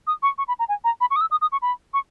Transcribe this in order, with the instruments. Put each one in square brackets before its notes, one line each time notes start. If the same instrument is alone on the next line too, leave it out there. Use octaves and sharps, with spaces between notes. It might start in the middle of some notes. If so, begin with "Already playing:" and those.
[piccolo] D#6
C#6
C#6
B5
A#5
G#5
A#5
B5
C#6
D#6
E6
D#6
D#6
C#6
B5
C#6